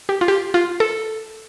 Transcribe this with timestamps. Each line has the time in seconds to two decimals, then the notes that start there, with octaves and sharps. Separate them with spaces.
0.09 G4
0.21 F4
0.28 G4
0.54 F4
0.80 A4